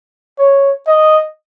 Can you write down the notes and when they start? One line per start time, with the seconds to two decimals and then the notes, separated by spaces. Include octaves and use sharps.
0.39 C#5
0.87 D#5